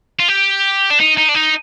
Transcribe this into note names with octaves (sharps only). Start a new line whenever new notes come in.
F4
G4
D4
D#4
D#4
D4
D#4